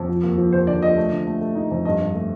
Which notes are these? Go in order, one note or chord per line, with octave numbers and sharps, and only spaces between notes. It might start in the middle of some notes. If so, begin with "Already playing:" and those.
Already playing: F2
F3
D#2
F3
D#2 C5
D3 D5
F3 D#5
A3
D3
A3
A3
D#4
F2
G2 D#5
G2
A3